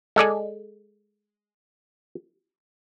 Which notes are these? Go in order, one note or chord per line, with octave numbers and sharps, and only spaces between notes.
G#3 A4 D5 G#5